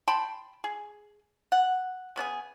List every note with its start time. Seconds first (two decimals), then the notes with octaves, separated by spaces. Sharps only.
0.08 G5 A5 B5 C6
0.64 G#4
1.52 F#5
2.16 C#3 B3 D4 G#4